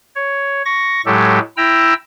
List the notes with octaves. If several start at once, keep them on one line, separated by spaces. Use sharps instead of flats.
C#5
C#6 A#6
A2 F#3 G#3 G4 A4
E4 G5 A#5 E6